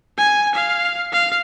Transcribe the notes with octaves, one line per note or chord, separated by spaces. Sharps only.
G#5
F5
F5